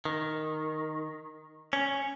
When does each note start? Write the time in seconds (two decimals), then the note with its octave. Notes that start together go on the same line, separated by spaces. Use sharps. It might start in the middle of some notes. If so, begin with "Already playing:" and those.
0.05 D#3
1.73 C#4